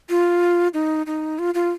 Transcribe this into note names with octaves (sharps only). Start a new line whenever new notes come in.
F4
D#4
D#4
F4
F4